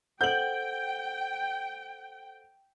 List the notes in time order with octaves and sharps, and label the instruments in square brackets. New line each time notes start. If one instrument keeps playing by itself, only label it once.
[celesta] A4 C5 F#5 [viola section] G5 [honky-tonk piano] G6 F#7